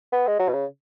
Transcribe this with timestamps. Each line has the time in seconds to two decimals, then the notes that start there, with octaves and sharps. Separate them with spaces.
0.13 B3
0.27 G#3
0.39 F#3
0.48 B2
0.53 C#3